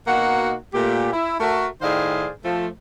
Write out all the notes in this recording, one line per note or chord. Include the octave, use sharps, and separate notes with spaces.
B2 A#3 D#4 F#4 F#5
A#2 A3 G4
E4
A3 F#4 A#4
A2 D#3 G#4 C5 D5 F5
F3 A3 A4